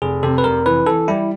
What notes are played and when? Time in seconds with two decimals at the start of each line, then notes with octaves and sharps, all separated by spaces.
0.02 F1 G#4
0.23 C3 A4
0.38 B4
0.44 F1 A#4
0.66 E3 B4
0.86 E3 A4
1.08 G3 E4